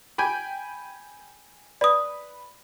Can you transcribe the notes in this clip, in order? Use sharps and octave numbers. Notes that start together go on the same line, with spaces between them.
G5 G#5 B5
B4 D5 D#6